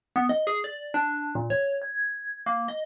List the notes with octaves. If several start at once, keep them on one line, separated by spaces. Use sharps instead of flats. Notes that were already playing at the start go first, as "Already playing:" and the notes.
B3
D#5
G#4
D5
D4
A#2
C#5
G#6
A#3
D#5